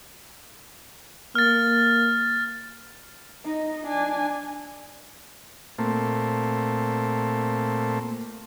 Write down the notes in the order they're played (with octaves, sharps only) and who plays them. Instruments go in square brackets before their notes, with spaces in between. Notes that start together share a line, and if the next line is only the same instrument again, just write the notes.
[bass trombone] A#3 [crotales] F6 A6
[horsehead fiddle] D#4 D#5
D4 G#5
[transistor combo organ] A#2 A3 C4